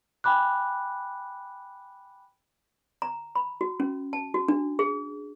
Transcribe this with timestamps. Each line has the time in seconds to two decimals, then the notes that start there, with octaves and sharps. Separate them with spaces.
0.24 G5 G#5 B5 D6 F#6
3.02 A#5
3.35 B5
3.61 F#4
3.80 C#4
4.13 A5
4.34 F#4
4.48 D4
4.79 G#4